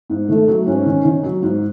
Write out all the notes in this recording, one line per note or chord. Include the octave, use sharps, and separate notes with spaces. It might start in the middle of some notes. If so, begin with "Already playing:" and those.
G#2
D#3 A3
F#3
G#2 C#4
D#3
D#3
F#3
G#2